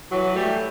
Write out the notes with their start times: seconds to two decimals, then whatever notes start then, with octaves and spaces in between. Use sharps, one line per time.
0.11 E3 F#3
0.35 G3 A3